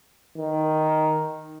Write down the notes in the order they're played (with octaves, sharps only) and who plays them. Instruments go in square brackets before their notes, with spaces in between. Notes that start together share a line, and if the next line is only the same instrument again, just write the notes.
[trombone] D#3